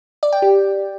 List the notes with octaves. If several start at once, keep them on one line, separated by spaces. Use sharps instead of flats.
D5
G5
G4